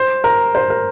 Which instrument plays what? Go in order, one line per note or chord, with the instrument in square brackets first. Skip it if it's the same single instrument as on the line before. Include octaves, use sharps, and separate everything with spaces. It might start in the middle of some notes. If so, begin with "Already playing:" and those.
Already playing: [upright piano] C5
A#4
C5
A#4